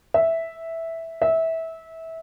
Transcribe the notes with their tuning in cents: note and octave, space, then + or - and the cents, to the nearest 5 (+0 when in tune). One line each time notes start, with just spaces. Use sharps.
E5 -5
E5 -20